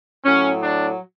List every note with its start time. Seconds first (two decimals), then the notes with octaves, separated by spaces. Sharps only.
0.25 A2 F#3 C#4
0.62 D4